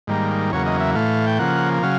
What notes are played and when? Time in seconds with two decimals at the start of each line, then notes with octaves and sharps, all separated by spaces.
0.07 G#2 D#3 G3 A#3
0.51 E2 C#3 F#3 A#3 C#5
0.66 D#5
0.80 E5
0.95 A2 E3 A3 F5
1.27 G5
1.39 C#3 F3 A#3 F#5
1.83 C#3 F#3 F5